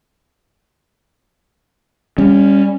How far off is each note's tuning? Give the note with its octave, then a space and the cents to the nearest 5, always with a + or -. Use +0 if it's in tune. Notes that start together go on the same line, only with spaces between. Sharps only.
G3 +30 C#4 +0